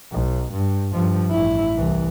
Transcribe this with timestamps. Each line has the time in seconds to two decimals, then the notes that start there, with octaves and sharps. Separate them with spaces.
0.13 B1
0.53 G2
0.93 G2 F3
1.31 A1 E4
1.77 C2 E3